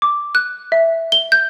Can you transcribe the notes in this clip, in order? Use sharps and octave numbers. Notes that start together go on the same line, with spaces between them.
D6
F#6
E5
G7
G6